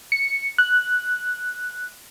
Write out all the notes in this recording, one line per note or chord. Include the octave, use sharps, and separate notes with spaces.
C#7
F#6